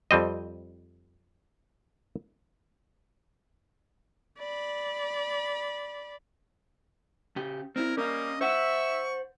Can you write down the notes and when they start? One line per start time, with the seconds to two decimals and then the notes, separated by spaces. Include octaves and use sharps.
0.11 F2 G3 C4 D#5
4.38 D5 B5
7.36 C#3 G4
7.76 C4 D#4 E4 A#4
7.97 G3 A#3 C#4 D#5
8.41 C5 E5 F#5 C#6